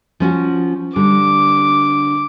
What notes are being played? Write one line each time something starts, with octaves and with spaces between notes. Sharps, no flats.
F3 C#4 F#4
D3 G3 D6